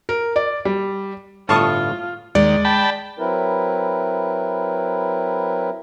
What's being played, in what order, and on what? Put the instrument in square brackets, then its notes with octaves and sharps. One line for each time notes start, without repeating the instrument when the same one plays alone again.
[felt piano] A#4
D5
G3
[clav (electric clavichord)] G1 A2 F5 [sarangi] F4 [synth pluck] A5 C#6 D#6
[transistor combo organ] D#2 [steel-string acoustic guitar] G#3 [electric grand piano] D5
[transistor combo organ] G5 A5 B5
[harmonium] F#3 C4 E4 A#4 B4